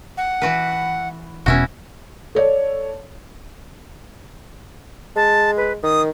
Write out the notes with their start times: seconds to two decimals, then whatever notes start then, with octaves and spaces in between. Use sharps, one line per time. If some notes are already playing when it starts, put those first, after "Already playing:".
0.17 F#5
0.42 E3 F#4 B4
1.46 E1 B2 C#4 E4 F#4
2.35 A4 C#5 D5
5.16 G#3 A5
5.57 B4
5.83 D#3 D#6